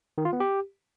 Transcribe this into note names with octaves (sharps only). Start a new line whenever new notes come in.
D#3
F4
B3
G4